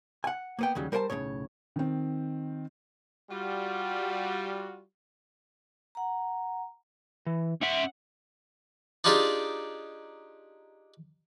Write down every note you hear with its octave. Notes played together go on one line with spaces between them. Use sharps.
F#5 G#5
A#3 B3 G5
D#2 C#3 F#3 G3
G3 A#4 C5 G5 A5
B1 F#2 A2 C#3 C#5
D#3 C4
G3 F4 F#4
F#5 A#5
E3
C#4 E5 F#5
D4 D#4 F4 G4 G#4 D5